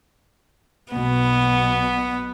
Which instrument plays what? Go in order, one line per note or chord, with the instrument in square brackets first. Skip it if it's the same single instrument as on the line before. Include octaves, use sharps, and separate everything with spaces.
[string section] B1 B2 [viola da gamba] B3